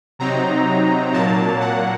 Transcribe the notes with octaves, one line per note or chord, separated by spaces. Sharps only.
C3 F#3 C4 D#4 A#5
A#2 F#3 A#3 A5
F#5